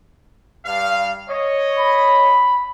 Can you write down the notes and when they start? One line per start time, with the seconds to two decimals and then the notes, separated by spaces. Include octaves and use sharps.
0.65 G2 F5
1.29 C#5 D#5
1.79 B5